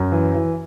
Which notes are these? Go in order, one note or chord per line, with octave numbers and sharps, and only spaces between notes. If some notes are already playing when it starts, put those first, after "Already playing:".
Already playing: F#2
E3
E3